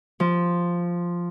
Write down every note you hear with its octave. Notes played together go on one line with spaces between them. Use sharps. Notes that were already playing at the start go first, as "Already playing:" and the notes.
F3